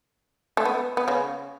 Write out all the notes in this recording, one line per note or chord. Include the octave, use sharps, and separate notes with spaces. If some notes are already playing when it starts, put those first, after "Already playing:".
A3
B3
B3
C#3 C#4